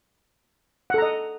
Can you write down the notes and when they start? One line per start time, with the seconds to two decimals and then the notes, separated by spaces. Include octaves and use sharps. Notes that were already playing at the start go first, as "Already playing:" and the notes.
0.90 F#5
0.94 A4
0.98 A#5
1.02 D#5